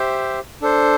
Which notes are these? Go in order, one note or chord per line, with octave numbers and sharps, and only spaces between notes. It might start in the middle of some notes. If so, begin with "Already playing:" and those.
Already playing: G4 C5 E5
D4 A4 C5